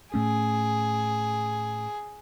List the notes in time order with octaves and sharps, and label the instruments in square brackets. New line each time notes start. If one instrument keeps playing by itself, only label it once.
[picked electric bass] A2 A3 C#4 [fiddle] G#4